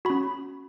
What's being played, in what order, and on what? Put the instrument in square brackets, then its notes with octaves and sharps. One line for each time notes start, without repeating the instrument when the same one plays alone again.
[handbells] C#4 F#4 B5